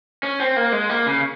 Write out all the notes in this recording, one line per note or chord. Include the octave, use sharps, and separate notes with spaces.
C#4
C4
A#3
G#3
A#3
C#3